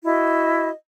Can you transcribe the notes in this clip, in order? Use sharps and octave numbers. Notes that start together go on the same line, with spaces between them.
E4 F#4 D#5